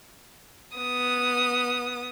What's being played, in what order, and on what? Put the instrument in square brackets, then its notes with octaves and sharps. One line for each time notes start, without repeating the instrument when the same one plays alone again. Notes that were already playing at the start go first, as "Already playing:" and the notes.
[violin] B3 D#6